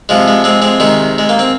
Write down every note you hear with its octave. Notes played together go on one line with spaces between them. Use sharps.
C3 F3 G#3
G#3
G#3 C4
G#3 C4
C3 D#3 G#3
G#3
A#3
C4